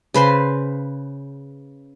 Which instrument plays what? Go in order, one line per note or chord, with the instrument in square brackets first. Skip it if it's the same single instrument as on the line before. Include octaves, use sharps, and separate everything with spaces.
[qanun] C#3 B4 C5 C6